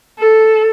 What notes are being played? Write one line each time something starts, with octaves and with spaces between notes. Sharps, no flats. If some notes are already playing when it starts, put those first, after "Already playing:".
A4